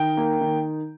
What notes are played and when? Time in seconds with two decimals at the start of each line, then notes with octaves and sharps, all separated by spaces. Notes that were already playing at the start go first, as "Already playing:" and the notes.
Already playing: D#3 G5
0.17 A#3
0.41 D#3